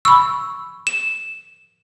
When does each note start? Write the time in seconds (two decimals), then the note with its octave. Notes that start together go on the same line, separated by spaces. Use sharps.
0.05 B5 C#6 E6
0.87 E7